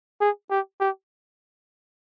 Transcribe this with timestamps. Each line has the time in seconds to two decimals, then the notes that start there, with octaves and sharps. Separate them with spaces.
0.21 G#4
0.51 G4
0.80 G4